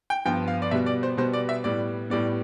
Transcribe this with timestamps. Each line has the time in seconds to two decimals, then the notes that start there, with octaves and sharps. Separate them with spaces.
0.10 G5
0.25 G2 F3 B3 G5
0.48 F5
0.62 D5
0.71 B2 G3 B3 E5
0.86 D5
1.03 C5
1.17 B2 G3 B3 C5
1.33 D5
1.49 E5
1.64 A2 G3 B3 D5
2.10 A2 G3 B3 D5